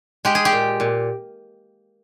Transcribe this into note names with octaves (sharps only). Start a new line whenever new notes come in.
G#3 G4
G#4
G4
A#2
A#2